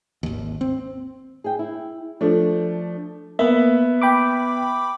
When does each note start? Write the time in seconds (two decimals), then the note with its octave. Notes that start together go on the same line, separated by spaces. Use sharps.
0.23 G#1 D#2
0.61 C4
1.44 G#4 G5
1.59 E4
2.21 F3 A3 D4
3.39 A#3 B3 E5
4.02 G5 B5 D6